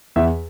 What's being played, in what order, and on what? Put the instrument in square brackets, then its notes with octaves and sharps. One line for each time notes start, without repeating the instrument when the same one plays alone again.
[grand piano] E2 E5